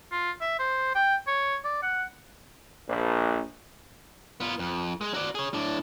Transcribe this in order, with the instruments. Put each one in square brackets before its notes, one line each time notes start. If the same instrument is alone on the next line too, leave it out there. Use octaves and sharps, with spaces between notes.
[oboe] F4
E5
C5
G5
C#5
D5
F#5
[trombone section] A#1
[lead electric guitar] B3 F4
F2
G#3
F#4 D5
G#4 C#5
A2 D4